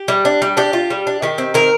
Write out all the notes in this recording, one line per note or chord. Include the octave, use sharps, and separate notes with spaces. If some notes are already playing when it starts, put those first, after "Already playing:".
Already playing: G4
G3
D4
G3
D4 G4
F4
G3
D4
D#3 G4
C4
D#3 A#4